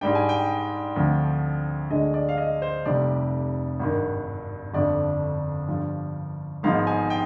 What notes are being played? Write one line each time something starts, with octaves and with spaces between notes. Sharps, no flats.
G#2 G3 D4 G5
G#5
G5
D2 D3 F3 C4
D2 D3 G#3 D4 D#5
D5
F5
D#5
C5
F1 F2 C3 G3 D5
G#1 G2 D#3
G1 F2 D3 D5
G1 G2 F3
G#1 G#2 F3 B3 D#4 F5
G#5
G5